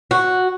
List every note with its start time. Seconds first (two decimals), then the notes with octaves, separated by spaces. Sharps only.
0.11 F#4